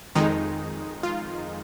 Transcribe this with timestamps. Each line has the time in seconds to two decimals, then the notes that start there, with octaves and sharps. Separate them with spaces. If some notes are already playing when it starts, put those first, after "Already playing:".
0.15 F2 D#3 G#3 D#4
1.03 F4